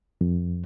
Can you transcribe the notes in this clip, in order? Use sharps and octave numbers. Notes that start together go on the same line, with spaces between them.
F2